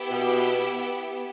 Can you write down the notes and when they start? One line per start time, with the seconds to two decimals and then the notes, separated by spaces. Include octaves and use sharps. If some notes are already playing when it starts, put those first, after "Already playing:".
Already playing: B3 E4 G4
0.10 B2